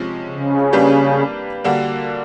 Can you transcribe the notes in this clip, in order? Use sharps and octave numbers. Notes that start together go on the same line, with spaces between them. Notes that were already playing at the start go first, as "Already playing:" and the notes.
Already playing: C3 F3 G#3 C#4
C#3
G3 A#3 D4 G4 B4
D3 G3 A#3 D4 F#4